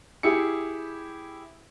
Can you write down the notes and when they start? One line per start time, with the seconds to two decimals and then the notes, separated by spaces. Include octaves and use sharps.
0.23 E4 G4 G#4 C#7